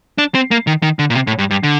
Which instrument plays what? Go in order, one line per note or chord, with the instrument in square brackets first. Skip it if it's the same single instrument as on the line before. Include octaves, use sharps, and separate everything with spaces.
[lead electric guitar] D4
C4
A#3
D#3
D#3
D3
A#2
C3
A2
G2
G2
D3